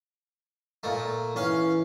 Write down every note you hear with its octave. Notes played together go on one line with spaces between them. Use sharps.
A#2 A3
E3 C#4 F5